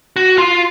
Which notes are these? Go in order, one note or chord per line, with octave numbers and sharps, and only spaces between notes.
F#4
F4